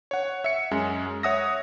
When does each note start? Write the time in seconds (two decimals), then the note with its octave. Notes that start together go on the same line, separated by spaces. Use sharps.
0.11 C#5 F#5
0.44 E5 C#7
0.71 F#2 G#3 C#4
1.23 C#5 E5 F#5 D#6 E6 A#6